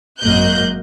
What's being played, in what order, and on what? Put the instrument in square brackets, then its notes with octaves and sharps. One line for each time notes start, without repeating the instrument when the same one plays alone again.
[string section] G#1 F#2 A#3 D#5 F#6 G6